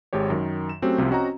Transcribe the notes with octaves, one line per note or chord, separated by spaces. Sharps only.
G#1 G#3 G4 C#5
F#2 D#3
E7
F#3 A3 C4 C#4 F#4 G4
C2 C3 F3 F4
C4 C#4 F#4 D#5 F#5 A#5